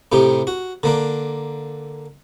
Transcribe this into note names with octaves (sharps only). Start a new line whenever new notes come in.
A2 C3 D#4 G4
F#4
D3 A#3 D4